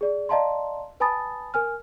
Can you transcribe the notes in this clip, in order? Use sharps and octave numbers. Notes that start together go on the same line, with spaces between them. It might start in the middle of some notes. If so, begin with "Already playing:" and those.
G#4 D5
D5 D#5 F5 A5 A#5 C6
B4 G#5 A5 B5 D#6 A6
A#4 G#5 F6